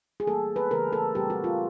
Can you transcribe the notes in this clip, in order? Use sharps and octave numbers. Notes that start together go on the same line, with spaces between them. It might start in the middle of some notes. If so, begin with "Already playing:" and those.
G#4
E3 G3 A#3 A4
B4
C#3 E3 A3 A#4
A4
A#2 G3 C4 G4
F#4
F4